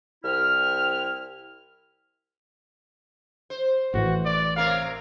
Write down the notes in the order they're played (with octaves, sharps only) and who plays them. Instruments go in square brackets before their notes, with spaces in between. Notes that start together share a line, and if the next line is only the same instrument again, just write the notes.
[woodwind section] C2 C4 E4 F6
[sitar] C5
[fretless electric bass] A1 A2 E3 [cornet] F#4
[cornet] D5
[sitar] C3 A#4 C#5 [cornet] F5